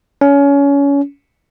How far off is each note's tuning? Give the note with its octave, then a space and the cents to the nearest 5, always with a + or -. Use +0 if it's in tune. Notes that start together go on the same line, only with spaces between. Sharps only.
C#4 +25